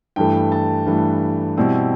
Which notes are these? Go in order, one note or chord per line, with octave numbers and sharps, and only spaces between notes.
G2 E3 A3 G5
A5
G2 E3 A3
B2 G3 C4 E4